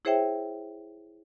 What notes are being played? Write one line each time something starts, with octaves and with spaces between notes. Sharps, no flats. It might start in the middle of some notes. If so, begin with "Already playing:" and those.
E4 G#4 C5 C#5 E5 G5